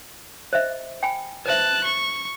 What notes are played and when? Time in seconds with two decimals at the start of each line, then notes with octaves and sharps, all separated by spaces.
0.53 C5 D#5 E5
1.03 G5 G#5 B5
1.46 B4 C5 E5 A5 F#6
1.84 C#6